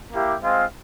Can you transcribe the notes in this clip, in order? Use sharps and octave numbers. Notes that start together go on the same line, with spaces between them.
A#3 E4 G4
G#3 C4 F4